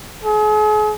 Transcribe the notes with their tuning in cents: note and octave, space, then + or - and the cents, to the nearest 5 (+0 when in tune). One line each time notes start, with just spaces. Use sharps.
G#4 +40